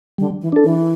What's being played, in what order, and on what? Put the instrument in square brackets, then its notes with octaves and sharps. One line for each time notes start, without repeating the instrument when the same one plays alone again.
[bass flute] D3 [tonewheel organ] G3
[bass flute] E3
[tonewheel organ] D4 A4
[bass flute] E3